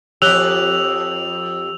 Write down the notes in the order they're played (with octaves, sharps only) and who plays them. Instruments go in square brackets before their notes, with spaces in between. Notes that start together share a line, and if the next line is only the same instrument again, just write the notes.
[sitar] F2 G4 [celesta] C#5 F#6 G7 [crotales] E6 F7